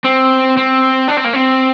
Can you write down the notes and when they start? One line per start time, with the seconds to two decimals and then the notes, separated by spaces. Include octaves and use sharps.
0.04 C4
0.57 C4
1.09 D4
1.18 C4
1.25 A#3
1.34 C4